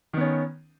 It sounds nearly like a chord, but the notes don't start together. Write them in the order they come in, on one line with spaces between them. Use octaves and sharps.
D#3 B3 C#4